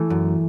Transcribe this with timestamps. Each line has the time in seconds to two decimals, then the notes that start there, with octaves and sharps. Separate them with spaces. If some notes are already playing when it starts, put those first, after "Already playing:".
Already playing: E3 A3
0.10 F#2